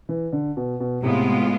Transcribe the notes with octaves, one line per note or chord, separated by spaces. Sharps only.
E3
D3
B2
B2
A2 C3 G#3 B3 F4